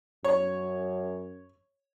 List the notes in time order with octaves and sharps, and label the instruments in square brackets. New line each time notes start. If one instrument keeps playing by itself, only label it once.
[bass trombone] F#2 [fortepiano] C#5